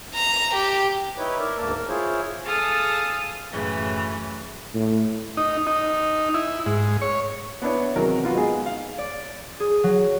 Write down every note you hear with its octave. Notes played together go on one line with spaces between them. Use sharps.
A#5
G4
D#4 E4 B4 C#5
A#4 D5 E5
D2 G#2 A#3 A#4 A5
A#4
E4 F4 G#4 C5 C#5
G#4 A4 F5 A5 D#6 F6
F#2 A2 C#3 E3
A2
D#4
D#4
E4
G#2
C#5
B3 D4 E4 C#5
C3 D#3 E3 F#3 G#4 A#4
B3 F4 F#4
G#3 B3 D#4 G#4
F5
D5
G#4
F#3